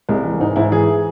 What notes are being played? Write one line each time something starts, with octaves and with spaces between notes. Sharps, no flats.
C2 G#3
E3
G#2 D#4
G#2 E4
E3 G#4